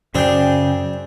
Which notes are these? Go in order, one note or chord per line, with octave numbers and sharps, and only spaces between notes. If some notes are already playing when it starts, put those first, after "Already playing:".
F#2 C#3 C4 D4 G#4 G5